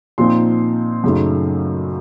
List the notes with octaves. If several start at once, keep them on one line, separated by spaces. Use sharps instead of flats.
A#2 F3 C4 D#4 C6
F#2 C#3 A3 D#4